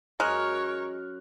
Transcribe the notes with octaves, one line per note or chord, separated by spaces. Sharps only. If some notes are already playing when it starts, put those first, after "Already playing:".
F#2 G#3 A#4 C#5 A#5 F6 F#6